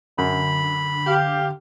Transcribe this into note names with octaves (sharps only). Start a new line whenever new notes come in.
F#2 D3 B5
G4 F5